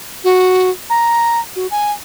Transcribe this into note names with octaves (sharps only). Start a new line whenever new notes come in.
F#4
A#5
F#4
G#5